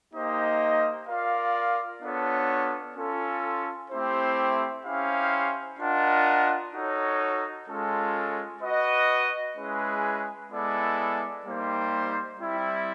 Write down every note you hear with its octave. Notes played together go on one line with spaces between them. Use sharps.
A#3 D#4 G4 C5 D#5
F4 A#4 D5 F5
B3 D4 F4 A4 C#5
C#4 F4 A4
A3 C4 E4 G4 C5
C#4 E4 G4 C5 F5
D4 F4 A#4 D#5 F#5
D#4 F#4 A4 C#5
G#3 C#4 F4 A4
F#4 B4 D#5
G#3 C#4 E4 G#4 B4
G#3 B3 E4 A4 D5
G3 A#3 D#4 G4 C5
G3 C4 E4